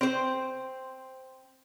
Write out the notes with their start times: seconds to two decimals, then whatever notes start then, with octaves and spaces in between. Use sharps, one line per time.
0.01 C4 C5